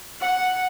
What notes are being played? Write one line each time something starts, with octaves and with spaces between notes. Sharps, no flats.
F#5